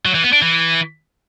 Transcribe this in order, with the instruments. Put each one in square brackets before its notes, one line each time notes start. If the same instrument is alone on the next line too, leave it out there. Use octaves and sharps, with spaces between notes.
[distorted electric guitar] F#3
E3
B3
D4
E3